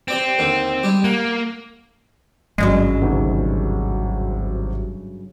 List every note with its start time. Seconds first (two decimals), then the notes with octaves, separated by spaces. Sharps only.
0.08 C4 G4 D5 G5
0.39 D#2 D3 D#4
0.83 G3 G#3 G4
1.04 A#3 F#5
2.58 G#1 G2 C#3 F#3 G#3
3.01 D2 C3 D#3